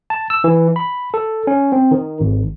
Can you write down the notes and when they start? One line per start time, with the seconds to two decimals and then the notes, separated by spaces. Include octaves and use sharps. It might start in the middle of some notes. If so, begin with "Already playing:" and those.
0.10 A5
0.30 E6
0.44 E3
0.76 B5
1.14 A4
1.47 C#4
1.72 C4
1.91 D#3
2.21 G#1